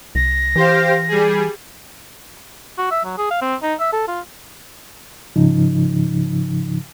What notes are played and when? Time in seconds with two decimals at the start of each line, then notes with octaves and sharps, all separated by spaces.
0.15 C2 A#6
0.56 E3 G4 C5 F5
1.08 G3 G#4
2.78 F#4
2.91 E5
3.05 F#3
3.18 G#4
3.30 F5
3.42 C4
3.62 D#4
3.80 E5
3.93 A4
4.08 F4
5.36 G#2 C#3 F3 D#4